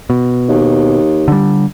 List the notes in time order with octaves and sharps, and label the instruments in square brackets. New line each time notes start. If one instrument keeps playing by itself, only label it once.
[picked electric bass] B2
[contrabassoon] D#2
[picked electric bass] D3 G3